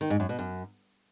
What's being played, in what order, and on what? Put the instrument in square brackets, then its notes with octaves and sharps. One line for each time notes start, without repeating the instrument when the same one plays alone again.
[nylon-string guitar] D#3
G#2
F#2
B2
F#2